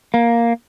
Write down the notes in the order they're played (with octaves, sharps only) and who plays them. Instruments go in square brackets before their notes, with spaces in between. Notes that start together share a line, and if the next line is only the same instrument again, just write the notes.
[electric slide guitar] A#3